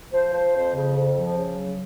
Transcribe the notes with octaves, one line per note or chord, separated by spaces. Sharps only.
F3 C5
F3 C5
F2 C5
C#3
F2
F3
C#3
F#3